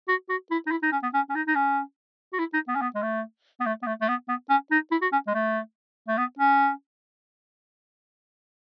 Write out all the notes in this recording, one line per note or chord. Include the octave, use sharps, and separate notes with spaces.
F#4
F#4
E4
D#4
E4
D#4
C#4
B3
C#4
C#4
D#4
D#4
C#4
F#4
E4
D#4
B3
C#4
B3
G#3
A3
B3
A3
B3
A3
A3
B3
B3
C#4
D#4
E4
F#4
C#4
G#3
A3
A3
B3
C#4